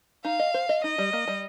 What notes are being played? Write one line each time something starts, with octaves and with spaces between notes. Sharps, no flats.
D#4 F5
D#5
C5
D#5
D#4 D#5
G3
A#3
G3